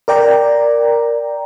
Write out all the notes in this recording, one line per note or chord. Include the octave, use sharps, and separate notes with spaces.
A#4 D5 G5 A#5